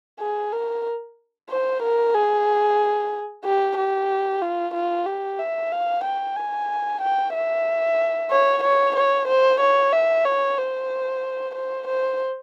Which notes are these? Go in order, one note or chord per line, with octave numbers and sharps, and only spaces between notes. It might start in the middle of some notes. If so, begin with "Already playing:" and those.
G#4
A#4
C5
A#4
G#4
G4
G4
F4
F4
G4
E5
F5
G5
G#5
G5
E5
C#5
C#5
C#5
C5
C#5
E5
C#5
C5
C5
C5